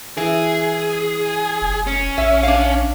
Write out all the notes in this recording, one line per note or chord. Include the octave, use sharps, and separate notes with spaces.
E3 G#4
F#1
C#4
A#1 E5
D4 C#5 F5